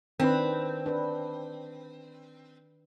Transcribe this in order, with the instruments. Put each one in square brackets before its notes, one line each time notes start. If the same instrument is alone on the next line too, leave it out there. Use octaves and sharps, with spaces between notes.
[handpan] D#3 D4 B4 [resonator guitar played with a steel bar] C4
[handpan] D4 B4